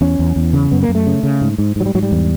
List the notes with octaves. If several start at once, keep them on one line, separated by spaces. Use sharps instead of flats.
E2 C#4
E2
E2
C#3
F#2 B3
A#3
F#2
A3
C#3
C#3
G#2
G#2
G#2 F#3
G3
G#2 F#3
G3
E2